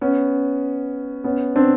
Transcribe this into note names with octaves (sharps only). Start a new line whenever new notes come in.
B3 C#4
B3 C#4
C4 D4